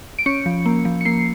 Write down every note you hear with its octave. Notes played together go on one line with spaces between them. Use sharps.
D7
C#4 C#7
F3
A#3
F3
C#7
A#3 C7